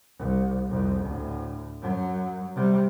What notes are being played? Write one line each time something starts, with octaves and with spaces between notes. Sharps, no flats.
C2
C2 F2
D2 A2
F#2 F#3
C3 G3